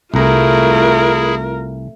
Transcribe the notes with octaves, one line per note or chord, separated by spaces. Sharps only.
C2 A3 E4 F4 G#4 A#4 A#5